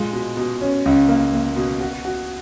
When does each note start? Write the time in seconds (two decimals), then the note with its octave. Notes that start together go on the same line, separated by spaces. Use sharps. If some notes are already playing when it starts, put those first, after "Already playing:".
Already playing: A#2 G#3
0.13 B2
0.37 B2
0.61 C#4
0.86 C#2
1.09 A#3
1.33 A#3
1.56 B2
1.81 F#4
2.05 F#4